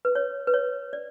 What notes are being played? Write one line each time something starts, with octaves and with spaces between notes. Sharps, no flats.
B4
C#5
B4
C#5
D5